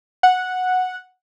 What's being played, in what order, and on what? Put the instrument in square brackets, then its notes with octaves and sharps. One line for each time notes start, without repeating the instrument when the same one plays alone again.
[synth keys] F#5